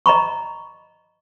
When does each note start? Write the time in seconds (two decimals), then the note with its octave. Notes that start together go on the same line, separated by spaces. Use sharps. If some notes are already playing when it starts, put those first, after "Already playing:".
0.06 D#5 A#5 B5 C#6